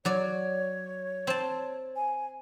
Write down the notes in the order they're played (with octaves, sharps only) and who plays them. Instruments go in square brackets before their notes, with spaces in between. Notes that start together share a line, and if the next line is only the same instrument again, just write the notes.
[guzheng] F#3 D5 [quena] C#5
[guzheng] C4 A5
[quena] G#5